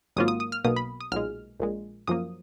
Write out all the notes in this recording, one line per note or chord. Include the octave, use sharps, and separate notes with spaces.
G#1 G#2 F#3 A#3 F4 D#6
D#6
D#6
F6
B1 B2 A#3 D#6
B5
D#6
B1 A#2 G#3 F6
A#1 A#2 G#3
F#2 F3 A#3 D#6